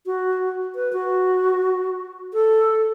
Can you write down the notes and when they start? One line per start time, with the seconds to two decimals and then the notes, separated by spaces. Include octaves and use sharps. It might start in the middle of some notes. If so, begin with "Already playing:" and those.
0.06 F#4
0.75 B4
0.93 F#4
2.33 A4